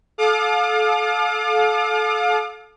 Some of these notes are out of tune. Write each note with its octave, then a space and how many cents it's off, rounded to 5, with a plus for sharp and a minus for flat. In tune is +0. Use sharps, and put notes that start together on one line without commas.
A4 -30 F5 +30 D6 +40